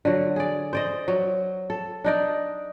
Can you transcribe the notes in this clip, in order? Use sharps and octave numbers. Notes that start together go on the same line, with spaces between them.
D3 F#3
G#4 D5
C5 D5 D#5
F#3
A4
D4 D#4 D5